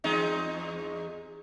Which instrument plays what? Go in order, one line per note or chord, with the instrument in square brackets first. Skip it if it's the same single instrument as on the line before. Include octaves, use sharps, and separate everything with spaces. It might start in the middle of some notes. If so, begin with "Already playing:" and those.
[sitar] E2 G#3 D#4